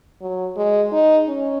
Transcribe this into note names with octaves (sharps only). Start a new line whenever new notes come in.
F#3
G#3
D#4
C#4